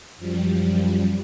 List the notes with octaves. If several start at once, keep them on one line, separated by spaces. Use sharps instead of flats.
F#2 F3 G3